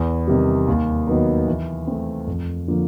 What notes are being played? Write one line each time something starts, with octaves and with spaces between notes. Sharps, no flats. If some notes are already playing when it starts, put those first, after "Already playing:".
Already playing: E2
C3 D#3 G3
D#2
D#3 F#3 B3 D#4
E3
A3 C4
F2
D3 F3 A#3